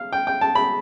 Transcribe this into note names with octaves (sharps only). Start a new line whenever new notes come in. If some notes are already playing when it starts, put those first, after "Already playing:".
Already playing: F5
G5
G5
A5
B5